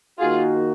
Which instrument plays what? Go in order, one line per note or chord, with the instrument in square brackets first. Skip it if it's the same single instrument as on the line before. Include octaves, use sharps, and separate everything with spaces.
[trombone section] D#3 A#3 D#4 F#4 [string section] F4 G#4